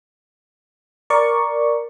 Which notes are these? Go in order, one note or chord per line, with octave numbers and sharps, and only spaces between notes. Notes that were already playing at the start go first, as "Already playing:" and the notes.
A#4 D5 C#6